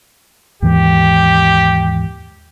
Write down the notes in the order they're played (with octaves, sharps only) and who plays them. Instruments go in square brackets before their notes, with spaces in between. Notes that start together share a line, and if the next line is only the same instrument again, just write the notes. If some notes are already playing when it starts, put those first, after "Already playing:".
[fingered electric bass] D#2 G#2 E3 [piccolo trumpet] G4